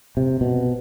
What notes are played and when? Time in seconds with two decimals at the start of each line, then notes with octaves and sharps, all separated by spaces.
0.17 C3
0.41 B2